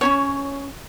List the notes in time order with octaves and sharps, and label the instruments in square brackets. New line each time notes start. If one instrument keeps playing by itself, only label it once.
[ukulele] C#4 D#4 C#5